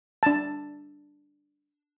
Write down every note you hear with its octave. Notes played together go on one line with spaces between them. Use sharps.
D4 A5